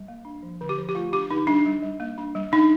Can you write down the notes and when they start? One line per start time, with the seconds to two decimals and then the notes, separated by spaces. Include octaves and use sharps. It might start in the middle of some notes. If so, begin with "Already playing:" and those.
Already playing: G3
0.08 A#3
0.25 D4
0.43 F3
0.61 D3
0.69 G4
0.78 F3
0.89 G4
0.95 A3 F4
1.12 D4 G4
1.30 D3 D#4
1.47 G3 D4
1.65 G3
1.83 G3
2.00 A#3
2.18 D4
2.35 G3
2.52 D4 D#4